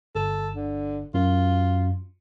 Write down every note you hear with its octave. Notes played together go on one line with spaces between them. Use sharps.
G1 A4
D3
F#2 F4